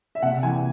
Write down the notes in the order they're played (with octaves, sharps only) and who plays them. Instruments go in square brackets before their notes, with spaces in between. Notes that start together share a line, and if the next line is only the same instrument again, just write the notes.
[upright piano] E5
C3 F#5
E3 G#5